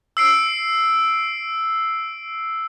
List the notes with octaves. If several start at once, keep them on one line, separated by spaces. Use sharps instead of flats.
E6 C7 D7